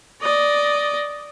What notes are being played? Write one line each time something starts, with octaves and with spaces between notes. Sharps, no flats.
D5 D#5